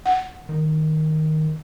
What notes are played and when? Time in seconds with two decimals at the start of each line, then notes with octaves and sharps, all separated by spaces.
0.06 F#5
0.49 D#3